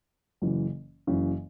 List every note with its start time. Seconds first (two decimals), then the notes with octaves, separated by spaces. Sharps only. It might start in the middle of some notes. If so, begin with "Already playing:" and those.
0.42 F#1 F#2 C#3 E3
1.07 F#1 F#2 C#3 E3